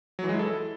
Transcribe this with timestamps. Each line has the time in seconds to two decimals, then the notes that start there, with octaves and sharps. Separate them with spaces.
0.19 F#3
0.24 E3
0.29 G#3
0.34 E4
0.39 A4